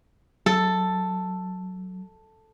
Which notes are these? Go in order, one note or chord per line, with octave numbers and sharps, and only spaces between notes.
F#3 A4